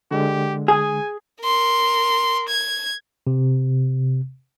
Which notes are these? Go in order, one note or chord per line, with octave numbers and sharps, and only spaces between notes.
D3 G#3 G4
G#4 G#5
A#4 C6
G#6
C3